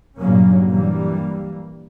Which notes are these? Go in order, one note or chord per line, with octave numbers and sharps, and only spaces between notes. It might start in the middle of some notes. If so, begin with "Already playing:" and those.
G2 A#2 C#3 F#3 A#3 C#4
G2 E3 G3 A#3